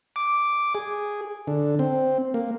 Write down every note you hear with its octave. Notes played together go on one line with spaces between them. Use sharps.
D6
G#4
D3
C4
A#3